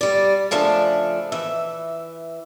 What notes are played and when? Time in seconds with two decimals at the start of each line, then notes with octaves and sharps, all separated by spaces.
0.01 G3 D5
0.51 C#3 F3 A3 D4
1.32 E3 E5